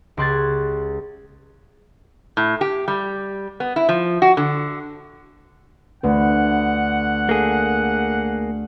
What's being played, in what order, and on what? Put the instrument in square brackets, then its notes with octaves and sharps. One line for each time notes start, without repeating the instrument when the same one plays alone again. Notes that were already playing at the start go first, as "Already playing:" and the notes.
[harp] C#2 G4 C6 F#6 G#6 A6
[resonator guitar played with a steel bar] A2
G4
G3
B3
E4
F3
F#4
D3
[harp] D2 [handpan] A3 D4 B4 [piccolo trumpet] F#5
[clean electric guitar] A#3 G#4 [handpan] A4